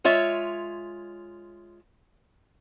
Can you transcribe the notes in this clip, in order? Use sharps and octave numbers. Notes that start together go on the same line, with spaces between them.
G#3 F4 C#5 E5